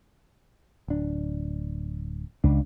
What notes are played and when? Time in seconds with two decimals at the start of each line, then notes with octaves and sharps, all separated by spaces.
0.88 D1 D4
2.44 C#2 D4